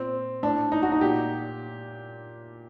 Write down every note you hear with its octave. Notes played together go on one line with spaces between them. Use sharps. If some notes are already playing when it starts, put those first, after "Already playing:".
Already playing: A#2 C4
A2 D4
D#4
F#4
D#4
A#2 G4